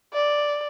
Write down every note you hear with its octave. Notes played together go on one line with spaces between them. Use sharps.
D5